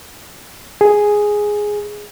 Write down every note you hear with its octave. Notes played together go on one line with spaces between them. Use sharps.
G#4